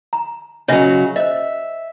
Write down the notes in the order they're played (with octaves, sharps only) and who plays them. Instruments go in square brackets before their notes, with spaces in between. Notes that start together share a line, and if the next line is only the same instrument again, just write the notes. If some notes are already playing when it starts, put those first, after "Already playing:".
[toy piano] A#5
[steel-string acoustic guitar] C#3 F#3 [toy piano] C#5 D#5 E5
[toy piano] C5 D#5 [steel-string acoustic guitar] E5